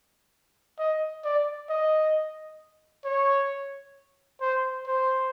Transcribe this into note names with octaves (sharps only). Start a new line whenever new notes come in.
D#5
D5
D#5
C#5
C5
C5